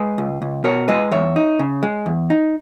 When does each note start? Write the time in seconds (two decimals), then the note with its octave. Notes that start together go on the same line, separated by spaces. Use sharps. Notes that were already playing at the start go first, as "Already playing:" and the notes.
Already playing: G#3 G#4 B4
0.18 C#2
0.42 C#2
0.64 B2 A#4 C#5
0.88 G#3 B4 D#5
1.11 E2 C#5 E5
1.36 D#4
1.59 C#3
1.83 G#3
2.06 E2
2.30 D#4